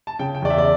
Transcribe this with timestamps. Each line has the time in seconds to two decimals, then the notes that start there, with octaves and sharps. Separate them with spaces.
0.07 A5
0.19 C#3 G5
0.35 G5
0.42 E2 D5
0.50 E5
0.58 D5